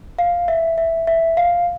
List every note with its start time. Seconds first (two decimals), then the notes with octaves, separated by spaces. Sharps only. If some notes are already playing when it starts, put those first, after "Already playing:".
0.19 F5
0.48 E5
0.78 E5
1.07 E5
1.37 F5